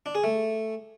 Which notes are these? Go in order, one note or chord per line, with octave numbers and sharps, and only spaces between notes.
D4
G#4
A3